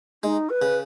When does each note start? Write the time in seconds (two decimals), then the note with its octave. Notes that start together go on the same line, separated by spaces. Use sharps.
0.23 G#3 D#4
0.49 B4
0.62 C#3